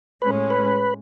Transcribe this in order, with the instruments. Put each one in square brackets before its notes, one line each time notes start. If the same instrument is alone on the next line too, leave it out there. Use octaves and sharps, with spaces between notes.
[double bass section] A2 G#3 C#4 [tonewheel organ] B4
[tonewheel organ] B4